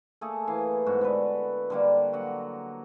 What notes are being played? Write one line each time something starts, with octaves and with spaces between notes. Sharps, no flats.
A3 A#3 G#4 A4
E3 F5
G#2 B3 F#4
D3 A4 B4
D3 G3 A#3
F#3 A#3 F#5